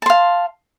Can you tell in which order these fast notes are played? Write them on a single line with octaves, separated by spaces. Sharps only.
A5 C6 F5